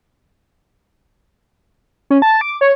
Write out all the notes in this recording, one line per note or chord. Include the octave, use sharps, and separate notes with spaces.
C#4
A5
D6
C#5